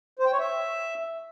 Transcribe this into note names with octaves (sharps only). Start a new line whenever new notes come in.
C5
G5
C#5
E5